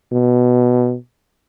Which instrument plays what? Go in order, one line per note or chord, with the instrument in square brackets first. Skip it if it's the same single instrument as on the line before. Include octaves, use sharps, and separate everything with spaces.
[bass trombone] B2